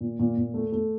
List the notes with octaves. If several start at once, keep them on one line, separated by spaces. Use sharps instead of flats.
A#2
A#2
A#2
A3
A3